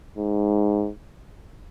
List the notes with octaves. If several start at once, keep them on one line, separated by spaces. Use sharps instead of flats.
G#2